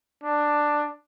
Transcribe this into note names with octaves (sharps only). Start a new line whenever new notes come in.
D4